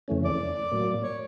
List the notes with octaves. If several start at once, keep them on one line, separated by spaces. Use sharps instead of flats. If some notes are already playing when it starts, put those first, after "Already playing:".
F2 C#3 E3 A3 C#4
D5
A2 F#3 A#3
C#5